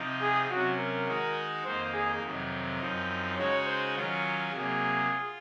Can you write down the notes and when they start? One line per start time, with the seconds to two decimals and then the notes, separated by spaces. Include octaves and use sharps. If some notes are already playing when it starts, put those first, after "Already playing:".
Already playing: C3 F3 C4 D#4
0.21 G#4
0.50 C3 F#3 C#4 F#4
0.79 A#4
1.07 D#3 G#3 D#4 F#4
1.65 F2 D#3 A#3 D#4 C5
1.93 G#4
2.23 F2 C3 D#3 F#3
2.80 F#2 F3 C4 D#4
3.37 C#3 G#3 D#4 F#4 C#5
3.66 C5
3.95 D#3 F#3 C#4 F4
4.52 C3 F#3 A#3 G#4
5.09 F4